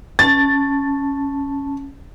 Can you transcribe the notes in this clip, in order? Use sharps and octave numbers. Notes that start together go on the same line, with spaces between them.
C#4 A5 A6